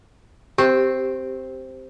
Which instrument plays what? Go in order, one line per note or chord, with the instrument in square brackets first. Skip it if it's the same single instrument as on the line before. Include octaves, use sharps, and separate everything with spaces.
[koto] C4 [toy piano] G4